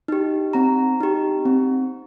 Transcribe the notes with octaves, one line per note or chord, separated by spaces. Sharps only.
D#4 G4
C4 A#5
D#4 G4
C4